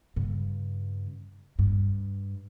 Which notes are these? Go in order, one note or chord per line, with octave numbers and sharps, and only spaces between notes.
G2 C#3
G2